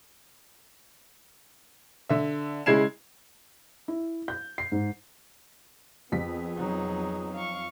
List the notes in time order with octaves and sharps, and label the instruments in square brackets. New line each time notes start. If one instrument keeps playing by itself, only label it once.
[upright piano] D3 E5
C#3 G#3 E4 G#6 C7 E7
[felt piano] E4
G6
C7
G#2
[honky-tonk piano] F2 B6 [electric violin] B3 G#4
[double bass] F#3 D#4
[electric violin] F5 C#6